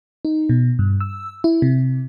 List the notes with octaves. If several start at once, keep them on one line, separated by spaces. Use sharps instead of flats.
D#4
B2
G2
E6
E4
C3